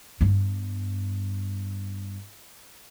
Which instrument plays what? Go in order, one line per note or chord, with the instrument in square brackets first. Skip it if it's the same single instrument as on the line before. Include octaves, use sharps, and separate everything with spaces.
[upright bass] G2 B3